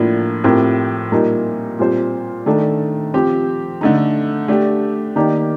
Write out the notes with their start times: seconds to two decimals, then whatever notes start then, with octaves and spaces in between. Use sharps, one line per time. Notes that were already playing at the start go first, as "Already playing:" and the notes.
Already playing: A2 F3 A#3 D4 F4
0.44 A2 F3 C4 G4 A#4
1.12 A#2 G3 A#3 D#4 A#4
1.79 A#2 G3 C4 F4 C5
2.46 D#3 A3 D4 A4
3.14 F3 C4 G4
3.81 D3 A3 D#4
4.48 A3 D4 G4
5.16 D#3 A#3 D#4 G4 D5